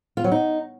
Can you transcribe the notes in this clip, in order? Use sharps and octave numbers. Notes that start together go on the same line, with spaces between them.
F4
F#3
D#4